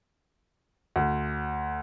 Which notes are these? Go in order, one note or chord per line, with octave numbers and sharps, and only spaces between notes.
D2